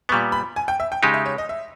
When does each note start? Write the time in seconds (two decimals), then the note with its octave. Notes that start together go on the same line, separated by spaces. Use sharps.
0.09 B3 C#6
0.12 A#2 G3
0.32 B5
0.56 G#5
0.68 G5
0.80 E5
0.92 G5
1.03 C#3 G#3 D#4 G4 G#5
1.14 E5
1.26 C#5
1.38 D#5
1.49 E5